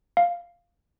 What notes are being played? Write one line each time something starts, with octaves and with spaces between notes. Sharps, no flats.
F5